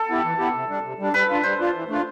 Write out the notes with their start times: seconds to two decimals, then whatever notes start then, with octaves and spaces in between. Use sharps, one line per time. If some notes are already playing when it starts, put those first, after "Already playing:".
Already playing: A4
0.09 B3 E4 G4
0.24 E3
0.38 B3 E4 G4
0.54 C3
0.69 G3 D4
0.83 C3
0.99 G3 D4
1.13 G3 B4
1.28 D4 F4
1.44 G3 C5
1.59 D4 F4
1.74 E3
1.88 A3 D4 F4